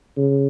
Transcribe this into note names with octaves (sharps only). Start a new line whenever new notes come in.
C#3